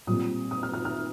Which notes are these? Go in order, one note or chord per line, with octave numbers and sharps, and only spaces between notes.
A#2 G3 C4 D#6
D#6
F6
F6
F6